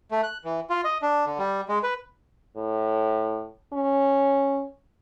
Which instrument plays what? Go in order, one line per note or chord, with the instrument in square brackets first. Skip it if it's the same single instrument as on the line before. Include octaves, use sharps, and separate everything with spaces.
[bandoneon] A3
F#6
E3
F4
D#5
D4
D3
G3
G#3
B4
[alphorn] A2
C#4